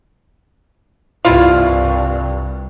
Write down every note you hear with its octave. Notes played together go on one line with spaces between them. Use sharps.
C2 G2 E4 F4